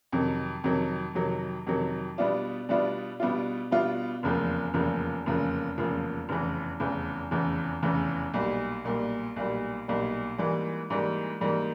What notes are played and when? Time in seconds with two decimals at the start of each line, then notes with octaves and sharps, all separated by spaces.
0.12 F2 C3 D#3 F#3
0.64 F2 C3 D#3 F#3
1.15 F2 C3 D#3 F#3
1.66 F2 C3 D#3 F#3
2.18 B2 G3 B3 D4 F4
2.69 B2 G3 B3 D4 F4
3.20 B2 G3 B3 D4 F4
3.71 B2 G3 B3 D4 F4
4.23 F1 E2 C#3 F3 A#3
4.74 F1 E2 C#3 F3 A#3
5.26 F1 E2 C#3 F3 A#3
5.77 F1 E2 C#3 F3 A#3
6.29 F1 E2 C#3 E3
6.80 F1 E2 C#3 E3
7.31 F1 E2 C#3 E3
7.82 F1 E2 C#3 E3
8.34 B1 A#2 G3
8.85 B1 A#2 G3
9.36 B1 A#2 G3
9.88 B1 A#2 G3
10.38 G#2 E3 G3 A#3
10.90 G#2 E3 G3 A#3
11.41 G#2 E3 G3 A#3